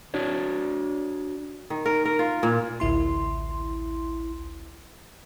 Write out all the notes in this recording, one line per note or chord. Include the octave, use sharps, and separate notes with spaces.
D4 F#4 C#5 D5
D#3
A#4
A#4
F4
A#2
A1 D2 E4 C6